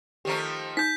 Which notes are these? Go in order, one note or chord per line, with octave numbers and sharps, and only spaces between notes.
D#3 F3 A3 G4 A#5
D#4 G6 B6